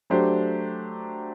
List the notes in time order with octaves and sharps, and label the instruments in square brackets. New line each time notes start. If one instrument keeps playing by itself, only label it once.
[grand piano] F#3 A3 D4 G4 C5